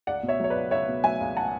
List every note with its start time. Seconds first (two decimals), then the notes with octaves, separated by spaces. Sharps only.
0.07 C#2 D5 F#5
0.23 B2
0.28 C#5 E5
0.40 F#3 C#5
0.50 B4 D5
0.55 C#2
0.71 C#2 C#5 E5
0.88 B2
1.04 F#3 E5 G#5
1.20 C#2
1.37 F#5 A5